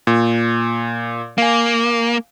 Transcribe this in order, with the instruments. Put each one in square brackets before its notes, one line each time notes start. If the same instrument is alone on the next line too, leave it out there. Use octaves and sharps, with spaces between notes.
[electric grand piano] A#2
[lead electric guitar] A#3 [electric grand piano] F5 G#5